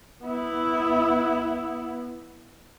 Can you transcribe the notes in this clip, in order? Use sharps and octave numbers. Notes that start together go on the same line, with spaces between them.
B3 E4